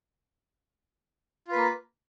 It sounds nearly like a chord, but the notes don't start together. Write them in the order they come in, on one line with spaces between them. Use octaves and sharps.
F4 B4 A#3